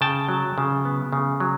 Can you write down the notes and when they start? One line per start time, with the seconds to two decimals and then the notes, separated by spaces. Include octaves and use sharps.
0.01 C#3 G5 A5
0.29 F#3
0.58 C#3
0.85 B3
1.13 C#3
1.40 F#3